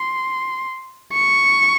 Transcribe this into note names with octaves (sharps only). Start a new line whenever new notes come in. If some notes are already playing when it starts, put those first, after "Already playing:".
Already playing: C6
C#6